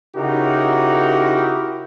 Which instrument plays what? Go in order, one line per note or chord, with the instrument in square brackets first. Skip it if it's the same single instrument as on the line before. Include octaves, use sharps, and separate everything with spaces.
[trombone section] C#3 D#4 E4 F#4 G4 A#4